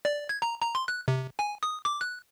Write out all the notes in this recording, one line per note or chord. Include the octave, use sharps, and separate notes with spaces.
D5
G#6
A#5
A#5
C6
F#6
C3
G#5
D#6
D6
F#6